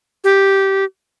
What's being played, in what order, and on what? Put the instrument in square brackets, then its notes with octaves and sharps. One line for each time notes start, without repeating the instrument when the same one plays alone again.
[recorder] G4